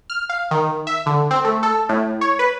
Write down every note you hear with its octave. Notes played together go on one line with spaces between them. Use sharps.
F6
F5
D#3
E5
D3
C4
A3
A4
A2
C#5
B4